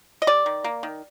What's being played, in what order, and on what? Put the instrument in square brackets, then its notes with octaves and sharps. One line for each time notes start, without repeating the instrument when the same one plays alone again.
[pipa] D#5
G3 D5
D#3
A#3
D#3